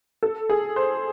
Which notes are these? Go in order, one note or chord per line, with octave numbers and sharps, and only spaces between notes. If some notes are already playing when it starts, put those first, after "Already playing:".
A4
G#4
C5